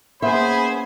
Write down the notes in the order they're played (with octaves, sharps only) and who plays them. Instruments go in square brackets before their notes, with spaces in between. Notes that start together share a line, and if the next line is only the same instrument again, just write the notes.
[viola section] A#3 C#4 G#5 [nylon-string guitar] B3 E5 [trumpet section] G#4 C5 [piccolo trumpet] B5